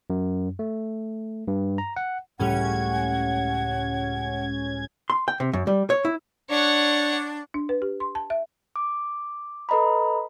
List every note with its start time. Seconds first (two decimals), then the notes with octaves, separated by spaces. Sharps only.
0.10 F#2
0.59 A3
1.48 G2
1.78 A#5
1.96 F#5
2.39 C#2 A2 G3 C#4 F#5 G#6
5.10 C6
5.28 G5
5.40 C3
5.53 F#2
5.67 G3
5.90 C#5
6.05 E4
6.50 D4 C#5 F#5
7.54 D4
7.69 B4
7.82 G4
8.00 C6
8.15 A5
8.30 E5
8.76 D6
9.69 A4 B4 D#5 A#5 B5